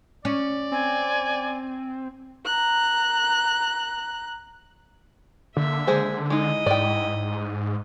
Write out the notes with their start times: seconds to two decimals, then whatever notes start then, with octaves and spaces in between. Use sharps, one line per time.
0.25 C#4 D5
0.72 C4 G#5
2.45 A#5 F#6
5.57 D3 A#3 E5
5.87 G#3 G#4 C5
6.30 G#3 D#4 E4 D#5
6.66 G#2 D5 G5